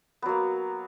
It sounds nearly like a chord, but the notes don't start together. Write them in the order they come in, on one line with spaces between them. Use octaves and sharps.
B3 F#3 A#3